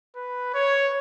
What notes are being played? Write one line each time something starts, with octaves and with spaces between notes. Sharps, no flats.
B4
C#5